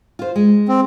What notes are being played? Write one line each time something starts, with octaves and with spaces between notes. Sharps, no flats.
F4 C5
G#3
C4